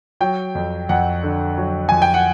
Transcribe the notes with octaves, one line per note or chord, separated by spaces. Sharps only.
F#3 G5
F2
F2 F#5
D3
F#3
F2 G#5
G5
F#5